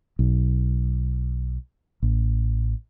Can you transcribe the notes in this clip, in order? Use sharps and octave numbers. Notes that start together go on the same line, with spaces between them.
B1
A1